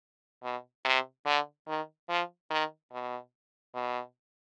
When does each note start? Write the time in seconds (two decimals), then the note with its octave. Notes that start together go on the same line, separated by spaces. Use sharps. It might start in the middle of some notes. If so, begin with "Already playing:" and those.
0.43 B2
0.85 C3
1.26 D3
1.67 D#3
2.09 F3
2.50 D#3
2.92 B2
3.75 B2